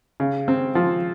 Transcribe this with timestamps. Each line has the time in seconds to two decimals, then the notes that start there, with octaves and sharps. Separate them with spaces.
0.20 C#3
0.48 C4
0.75 F3